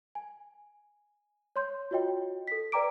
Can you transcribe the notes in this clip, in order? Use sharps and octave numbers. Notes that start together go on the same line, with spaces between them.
G#5
C#5 C6 G6
F4 F#4 C#5 D#5 G5
A4 B6
B4 D5 G5 A#5 D6 D7